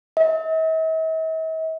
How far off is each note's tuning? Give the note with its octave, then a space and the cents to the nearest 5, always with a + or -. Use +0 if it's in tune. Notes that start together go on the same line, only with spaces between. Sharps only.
E5 -45